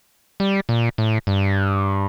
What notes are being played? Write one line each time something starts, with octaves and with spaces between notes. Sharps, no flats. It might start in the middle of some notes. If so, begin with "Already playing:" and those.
G3
A#2
A2
G2